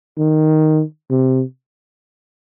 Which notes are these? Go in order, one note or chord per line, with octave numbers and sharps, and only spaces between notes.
D#3
C3